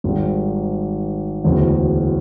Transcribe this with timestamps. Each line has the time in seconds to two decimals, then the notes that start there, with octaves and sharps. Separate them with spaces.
0.04 G#1 G#2 D#3 G3
1.44 E1 D2 C#3 E3